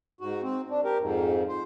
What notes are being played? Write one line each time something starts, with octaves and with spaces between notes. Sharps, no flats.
G#2 F#4
C4
D4
G4 A#4
F2 G#2
C5